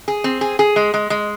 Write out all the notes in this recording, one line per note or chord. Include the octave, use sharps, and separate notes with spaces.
G#4
C4
G#4
G#4
G#3
G#3
G#3